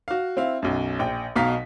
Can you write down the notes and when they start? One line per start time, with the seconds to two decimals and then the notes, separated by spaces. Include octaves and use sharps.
0.08 F#4 F5
0.37 C4 E4 F5
0.62 B1 F#2
0.99 A#1 G5
1.36 B1 B2 F5 A#5 B6